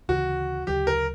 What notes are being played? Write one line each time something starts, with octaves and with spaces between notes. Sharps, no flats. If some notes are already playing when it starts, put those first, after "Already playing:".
D2 C#3 E3 F#4
D2 C#3 F#3 G4
A#4